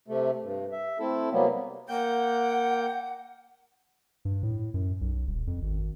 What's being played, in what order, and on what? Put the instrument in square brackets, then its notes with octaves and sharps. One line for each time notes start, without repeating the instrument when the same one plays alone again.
[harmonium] C3 A3
G2
E5
A3 C4 E4 A4
C3 F#3 G3 A#3 B3
[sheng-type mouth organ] A#3 G5 G6 [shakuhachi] F#5
[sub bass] G2
A2
F#2
B1
D#1
F2
G#1